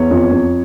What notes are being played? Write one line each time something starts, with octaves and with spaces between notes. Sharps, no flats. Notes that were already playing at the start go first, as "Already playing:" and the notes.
Already playing: E2 C#5
F2
F2